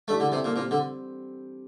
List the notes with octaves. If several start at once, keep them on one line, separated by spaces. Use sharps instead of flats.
E3 G3 A3 D4 A4 D5
D3
C3
A#2
A#2 G3 C4 G4
D3